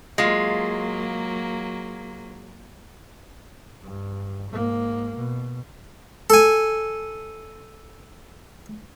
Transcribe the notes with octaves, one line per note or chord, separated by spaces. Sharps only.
F#3 G#3 A#3 F4
G2
G#2 A#3
B2
A4 G#5